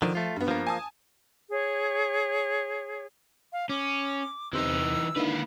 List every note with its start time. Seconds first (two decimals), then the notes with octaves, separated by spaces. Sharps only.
0.02 D3 D#3 F3
0.15 A3 F4
0.36 G2 B3
0.48 F3 A#3
0.67 G#5 A5 D#6
1.51 G#4 C#5
3.53 F5
3.69 C#4 D6
4.53 E2 C3 E3 D#4 C5 E6
5.16 D3 D#3 A#3 E4 B4